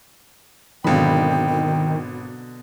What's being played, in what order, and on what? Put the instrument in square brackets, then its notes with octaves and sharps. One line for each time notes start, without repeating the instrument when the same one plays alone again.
[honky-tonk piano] G#1 B5 [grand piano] B2 D3 F#3 [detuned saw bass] D#3 [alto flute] G5